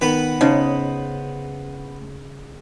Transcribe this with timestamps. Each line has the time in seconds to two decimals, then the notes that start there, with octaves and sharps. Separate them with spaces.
0.01 D#3 B3 B4
0.41 C#3 C#4 D#4 C5 D#5 A5